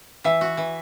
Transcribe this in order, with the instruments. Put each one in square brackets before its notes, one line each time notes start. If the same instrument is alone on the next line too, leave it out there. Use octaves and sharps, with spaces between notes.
[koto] E3 [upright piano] E5
[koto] F#4
E3